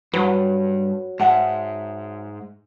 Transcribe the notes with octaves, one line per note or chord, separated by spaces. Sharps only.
G2 F#3 B4
G#2 E5 F#5 A5